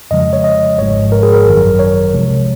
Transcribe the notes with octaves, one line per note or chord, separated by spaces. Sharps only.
F2 C#3 F3 G#3 D#5
C#5
D#5
G#1 G#2 F3 G#3 C#5
A#4
G#4
A#4
G#1 F#2 D#3 F#3
C#5
C2 C3 F3 G#3